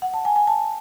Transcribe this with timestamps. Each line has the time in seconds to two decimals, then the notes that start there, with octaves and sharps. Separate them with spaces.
0.02 F#5
0.14 A5
0.25 G#5
0.36 G#5
0.47 A5